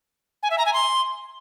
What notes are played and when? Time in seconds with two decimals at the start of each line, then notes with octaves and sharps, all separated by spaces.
0.43 G#5
0.50 E5
0.58 A#5
0.66 G#5
0.73 C6